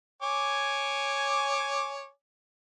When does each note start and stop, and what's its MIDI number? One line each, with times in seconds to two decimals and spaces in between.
0.22 2.08 73
0.22 2.08 80
0.22 2.08 86